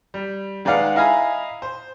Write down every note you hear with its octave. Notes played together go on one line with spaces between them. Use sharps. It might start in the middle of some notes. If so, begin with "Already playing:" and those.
G3
D#3 G#3 B4 D5 F5 F#5
E4 D#5 F5 G#5 A#5 B5
C5